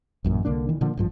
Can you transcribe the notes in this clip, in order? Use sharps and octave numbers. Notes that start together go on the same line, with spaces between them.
A1 F#2 A#2
C2 D3 A#3 D4
D#3 E3
A#2 D3 F3 A#3
A1 G2 F3